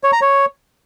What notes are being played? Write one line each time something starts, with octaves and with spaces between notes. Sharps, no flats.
C#5
A#5
C#5